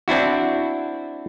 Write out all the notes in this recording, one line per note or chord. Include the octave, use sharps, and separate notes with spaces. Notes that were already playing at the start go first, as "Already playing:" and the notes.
C4 D4 E4 F#4